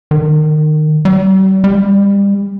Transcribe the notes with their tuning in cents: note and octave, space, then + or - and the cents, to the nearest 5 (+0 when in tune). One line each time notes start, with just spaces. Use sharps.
D#3 -25
G3 -40
G3 +30